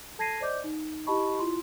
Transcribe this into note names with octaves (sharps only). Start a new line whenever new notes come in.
A4 A5 G#6 A#6 C7 D#7
C5 D5 D#5 D6 G6
D#4
E4 G4 D#5 A5 B5 C#6
E4 F4 C6